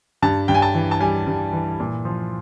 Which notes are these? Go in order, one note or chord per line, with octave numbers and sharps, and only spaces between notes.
G2 A5
G2 G5
G#5
A5
E3
A5
G3 G#5
G2
E3
A#2
F3